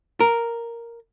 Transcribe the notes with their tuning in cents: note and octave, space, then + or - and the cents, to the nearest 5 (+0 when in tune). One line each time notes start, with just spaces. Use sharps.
A#4 +0